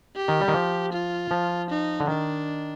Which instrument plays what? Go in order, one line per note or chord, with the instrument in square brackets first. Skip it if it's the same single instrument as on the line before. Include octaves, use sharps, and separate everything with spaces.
[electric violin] G4
[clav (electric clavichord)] D#3
G3
D#3
F3
[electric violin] F4
[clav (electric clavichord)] F3
[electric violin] D#4
[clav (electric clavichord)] D3
[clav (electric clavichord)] D#3 [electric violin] D4